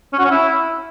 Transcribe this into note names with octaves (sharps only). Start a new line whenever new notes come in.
C#4
F#4
C#4
E4